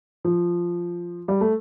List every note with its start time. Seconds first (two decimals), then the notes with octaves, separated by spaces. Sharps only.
0.25 F3
1.28 G3
1.41 A3